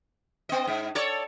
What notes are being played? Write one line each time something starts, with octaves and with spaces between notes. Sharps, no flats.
B3 D#5
G#2
A4 C#5 D5